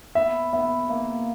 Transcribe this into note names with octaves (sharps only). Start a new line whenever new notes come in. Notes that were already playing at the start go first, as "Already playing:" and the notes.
B3 E5
B3 E5
A#3 E5